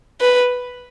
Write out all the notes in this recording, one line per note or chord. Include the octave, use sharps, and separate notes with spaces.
B4